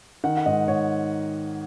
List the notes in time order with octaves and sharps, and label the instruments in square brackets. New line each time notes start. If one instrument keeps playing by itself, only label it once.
[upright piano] D#3 F#5
F#5
G#2 D#5
G#2 C#5